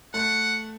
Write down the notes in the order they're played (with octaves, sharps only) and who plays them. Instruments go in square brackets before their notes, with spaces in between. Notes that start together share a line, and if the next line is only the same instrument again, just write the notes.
[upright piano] A3 [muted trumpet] F#5